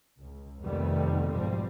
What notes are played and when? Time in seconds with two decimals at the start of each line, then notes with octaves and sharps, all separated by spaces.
0.20 C#2
0.62 F2 C3 D#3 G3 A3 B3
1.30 B1 G#2 B2 F3 G3 C4